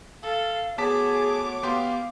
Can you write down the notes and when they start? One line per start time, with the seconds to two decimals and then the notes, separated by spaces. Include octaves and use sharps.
0.23 A4 F5
0.78 A3 B3 F#4 G#4 C#5 A5 D6 B6
1.63 B3 G4 F5 C6